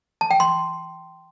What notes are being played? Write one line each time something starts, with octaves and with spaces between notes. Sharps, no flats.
A5
G5
C6